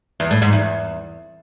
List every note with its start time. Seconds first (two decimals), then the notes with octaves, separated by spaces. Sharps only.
0.20 E2
0.31 A2
0.42 G#2
0.53 E2